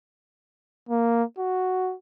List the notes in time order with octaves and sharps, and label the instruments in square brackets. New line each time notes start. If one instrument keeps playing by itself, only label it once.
[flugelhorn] A#3
F#4